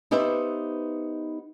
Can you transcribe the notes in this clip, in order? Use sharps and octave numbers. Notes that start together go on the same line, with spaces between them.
B3 D#4 G4 B4 C5 E5